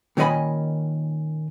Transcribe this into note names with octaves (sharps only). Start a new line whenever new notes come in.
A#2 D#3 C#4 D#5 G#5 B5